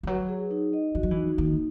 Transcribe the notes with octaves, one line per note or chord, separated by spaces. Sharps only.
E3
F#3 B4
G#4
D#4
D#5
E3 F#4
F#3
E3
D#4
D#3 A#3